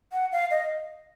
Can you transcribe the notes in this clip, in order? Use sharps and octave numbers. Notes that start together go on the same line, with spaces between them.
F#5
F5
D#5